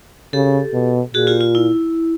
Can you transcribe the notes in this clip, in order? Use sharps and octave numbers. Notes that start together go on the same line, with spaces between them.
C#3 G4 A4
B2
A#2 F#4 G#4
F4 G4
F4
E4